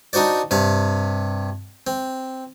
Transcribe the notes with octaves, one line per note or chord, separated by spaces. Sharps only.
D4 D#4 F#4 C5 D5
G2 C3 F5
C4